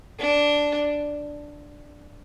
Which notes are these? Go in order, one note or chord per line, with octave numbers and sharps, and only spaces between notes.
D4